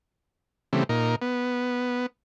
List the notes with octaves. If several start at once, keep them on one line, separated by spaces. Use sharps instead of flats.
C#3 E3 G3 A3 C4
A#2 D#4 A#4
B3